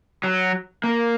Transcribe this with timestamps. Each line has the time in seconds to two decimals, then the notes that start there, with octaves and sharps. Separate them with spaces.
0.24 F#3
0.84 A#3